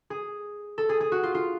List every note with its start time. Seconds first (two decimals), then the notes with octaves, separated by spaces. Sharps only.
0.10 G#4
0.78 A4
0.89 G#4
1.00 G#4
1.12 F#4
1.23 F4
1.34 F4